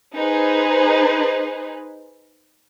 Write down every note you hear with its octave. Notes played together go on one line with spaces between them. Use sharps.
D#4 G#4 B4 C5